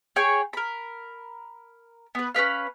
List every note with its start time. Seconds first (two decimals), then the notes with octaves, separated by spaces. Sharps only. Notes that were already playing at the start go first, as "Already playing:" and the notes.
0.16 G#4 C#5 G5 G#5
0.53 A#4 B5
2.15 B3 B4
2.35 C#4 A#4 B4 F5